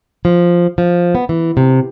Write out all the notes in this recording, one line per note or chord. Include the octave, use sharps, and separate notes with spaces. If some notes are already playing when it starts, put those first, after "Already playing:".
F3
F3
B3
E3
C3